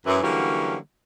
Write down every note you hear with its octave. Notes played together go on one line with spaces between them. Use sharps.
F#2 E3
D3 E3 F#3 G3 A#3 C#4